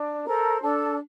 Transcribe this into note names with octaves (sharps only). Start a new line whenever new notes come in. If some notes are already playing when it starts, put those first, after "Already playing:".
Already playing: D4
A4 A#4 C5 A#5
D4 A4 A5